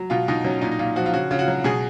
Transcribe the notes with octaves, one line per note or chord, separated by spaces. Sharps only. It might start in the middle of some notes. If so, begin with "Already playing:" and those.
Already playing: F#3
B2 F4
B2 D#4
F#3 C#4
A#2 D#4
D#4
A#2 F4
F3 F#4
F4
C#3 F#4
C#3 F4
F#4
F#3
B2 G#4